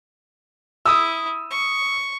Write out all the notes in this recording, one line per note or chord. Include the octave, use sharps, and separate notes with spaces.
E4 D#6 E6
C#6